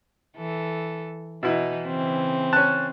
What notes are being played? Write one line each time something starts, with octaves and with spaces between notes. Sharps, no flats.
E3 A4
B2 E3 D#4 E4
C#3 E3 C4
C#4 A5 F#6